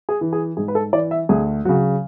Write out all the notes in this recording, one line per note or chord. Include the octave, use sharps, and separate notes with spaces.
G#4
E3
G#4
G#2 G#4
B4
A4
E3 D5
E5
D2 G#4
C#3 F#3 F#4